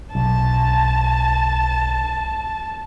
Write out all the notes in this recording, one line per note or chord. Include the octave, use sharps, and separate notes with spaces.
B1 A5